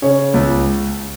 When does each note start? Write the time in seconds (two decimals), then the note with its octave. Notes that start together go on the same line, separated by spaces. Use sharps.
0.02 C#3 C#5
0.34 C#2